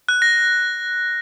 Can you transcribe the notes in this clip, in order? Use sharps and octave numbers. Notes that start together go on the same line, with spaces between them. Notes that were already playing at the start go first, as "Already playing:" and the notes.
F#6
A#6